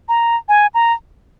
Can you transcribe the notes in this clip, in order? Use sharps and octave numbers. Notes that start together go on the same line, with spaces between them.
A#5
G#5
A#5